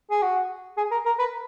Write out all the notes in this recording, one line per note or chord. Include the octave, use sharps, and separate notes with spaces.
G#4
F#4
G#4
A#4
A#4
B4